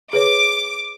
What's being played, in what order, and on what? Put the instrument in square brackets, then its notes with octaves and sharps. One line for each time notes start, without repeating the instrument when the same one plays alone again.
[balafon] G#4 B4 C#5 [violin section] D6